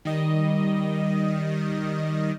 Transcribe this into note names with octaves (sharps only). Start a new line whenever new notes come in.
D#3 G3 D#5